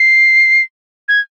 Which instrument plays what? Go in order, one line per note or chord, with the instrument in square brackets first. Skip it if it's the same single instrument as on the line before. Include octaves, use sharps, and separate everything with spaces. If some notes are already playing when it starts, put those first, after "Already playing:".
Already playing: [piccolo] C7
G#6